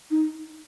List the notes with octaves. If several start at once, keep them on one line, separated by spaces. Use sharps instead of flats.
D#4